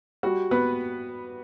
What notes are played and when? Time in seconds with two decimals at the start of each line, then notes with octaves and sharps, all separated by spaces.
0.23 G3 F#4
0.51 B3 B4